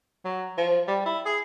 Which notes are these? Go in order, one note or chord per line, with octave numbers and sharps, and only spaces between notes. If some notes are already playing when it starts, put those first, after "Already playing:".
F#3
F3
G3
E4
G#4